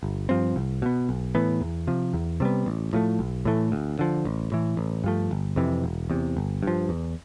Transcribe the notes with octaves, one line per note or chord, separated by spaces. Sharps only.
G1
G2 F3 C4
C2
B2 B3
B1
A2 E3 B3
E2
C3 F3
E2
C3 G3 B3
A1
A2 F3 A3
B1
A2 E3 A3
D2
D3 F3
A1
A2 E3
A1
G2 F3 A3
G1
F2 C3 E3
E1
E2 C3
G1
G2 F3
E2